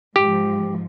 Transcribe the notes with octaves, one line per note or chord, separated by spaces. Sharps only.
G#2 F3 G4